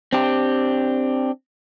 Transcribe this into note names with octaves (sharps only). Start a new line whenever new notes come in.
C4 D4 G4